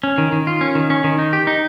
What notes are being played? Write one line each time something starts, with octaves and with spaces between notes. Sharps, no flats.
C#4
D#3
D#3
F4
C#4
D#3
C#4
D#3
D#4
G4
D#4